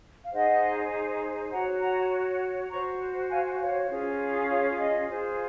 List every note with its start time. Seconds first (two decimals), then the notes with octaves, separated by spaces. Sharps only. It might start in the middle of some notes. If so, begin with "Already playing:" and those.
0.24 F5
0.32 D#4 G#4 C5 D#5 F#5
1.52 F#4 C#5 F#5 A#5
1.82 F#5 A#5
2.71 F#4 C5 A#5 C#6
3.30 F5 G#5
3.60 C#5 F5
3.90 C#4 F4 G#4
4.49 C#5 F5
4.79 D#5
5.09 F4 G#4 C5